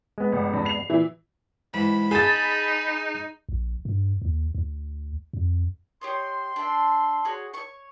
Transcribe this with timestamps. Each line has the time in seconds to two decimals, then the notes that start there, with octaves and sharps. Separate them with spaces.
0.18 G#3 B3
0.32 G1
0.53 E2 G2
0.65 C7 F7
0.89 A#2 E3 E4
1.74 G#2 E3 B5
2.11 D#4 G#4 G#5 A5 C6 A6
3.49 A#1
3.85 G2
4.22 D#2
4.55 D2
5.33 F2
6.01 G4 C#5 D#5 C6
6.56 D4 E5
7.25 F#4 G#4 C#5
7.54 C#5 C#6